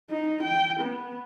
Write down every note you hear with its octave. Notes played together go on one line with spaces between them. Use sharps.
D#4
G5
B3